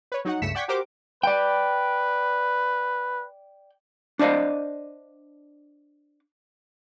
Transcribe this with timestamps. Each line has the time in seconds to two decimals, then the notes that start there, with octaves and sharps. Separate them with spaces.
0.12 B4 C#5
0.25 F#3 D#4 F#4 F#5
0.42 C#2 G2 A3 B6 C#7 E7
0.55 D5 F#5 G5 C#6 G#6 B6
0.68 F#4 G4 A#4 C5 D6
1.23 B4 D5 G5
4.19 D4 C5 D5 D#5 F5